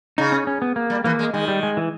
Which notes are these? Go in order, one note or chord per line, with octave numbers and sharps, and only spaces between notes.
C#3 D#4
C#4
C#4
B3
A#3
G3
E3 A#3
G#3
D#3 G#3
G3
G#3
E3